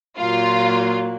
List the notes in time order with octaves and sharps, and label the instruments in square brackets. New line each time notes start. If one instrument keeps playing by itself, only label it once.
[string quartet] A#2 F#3 A#3 [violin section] F4